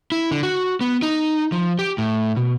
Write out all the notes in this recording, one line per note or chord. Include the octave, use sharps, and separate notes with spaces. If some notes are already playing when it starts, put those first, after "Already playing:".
E4
D3
F#4
B3
D#4
F3
G4
A2
B2